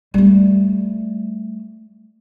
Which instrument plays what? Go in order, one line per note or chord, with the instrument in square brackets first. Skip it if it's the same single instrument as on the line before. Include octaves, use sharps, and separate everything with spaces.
[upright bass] G3 A3